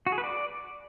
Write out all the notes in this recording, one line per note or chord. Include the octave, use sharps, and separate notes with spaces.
F#4
G#4
B4
D5